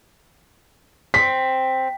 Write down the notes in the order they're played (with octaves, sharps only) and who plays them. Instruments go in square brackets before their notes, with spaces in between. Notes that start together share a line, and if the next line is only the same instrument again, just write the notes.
[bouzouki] C4 [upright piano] B6